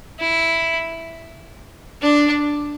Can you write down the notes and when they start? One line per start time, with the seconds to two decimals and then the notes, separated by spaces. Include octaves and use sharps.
0.20 E4
2.03 D4